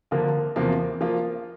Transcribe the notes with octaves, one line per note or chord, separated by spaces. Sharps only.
D3 F3 A#3 F4 A#4
E2 C3 F3 A#3
F3 A#3 F4